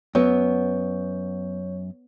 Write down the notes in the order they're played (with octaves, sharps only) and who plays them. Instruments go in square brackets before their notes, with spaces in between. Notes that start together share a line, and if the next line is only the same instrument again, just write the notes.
[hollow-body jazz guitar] F#2 [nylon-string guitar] B3 [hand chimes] C#5